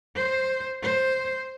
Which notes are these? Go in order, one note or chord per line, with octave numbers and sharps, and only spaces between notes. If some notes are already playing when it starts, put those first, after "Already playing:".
C5
C5